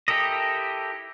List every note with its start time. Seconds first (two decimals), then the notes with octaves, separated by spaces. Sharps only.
0.08 E4 G4 A4 A#4 D#5